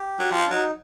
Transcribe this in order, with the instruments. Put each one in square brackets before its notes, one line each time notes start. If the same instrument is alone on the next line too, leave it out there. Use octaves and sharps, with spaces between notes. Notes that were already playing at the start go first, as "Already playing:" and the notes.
Already playing: [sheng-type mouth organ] G4
[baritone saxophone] F#3
[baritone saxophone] F3 [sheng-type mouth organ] F4
[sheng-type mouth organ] D4
[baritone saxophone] F#3 [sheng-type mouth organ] D#4